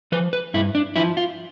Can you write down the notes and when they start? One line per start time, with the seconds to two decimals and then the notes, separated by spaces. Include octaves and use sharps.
0.12 F3 B4
0.33 B4
0.54 G2 E4
0.75 D4
0.96 F3 E4
1.17 F4